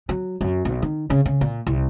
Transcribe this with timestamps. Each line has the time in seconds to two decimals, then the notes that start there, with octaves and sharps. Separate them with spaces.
0.09 F#3
0.41 F#2
0.65 B1
0.82 D#3
1.10 C#3
1.26 C#3
1.41 A#2
1.67 C2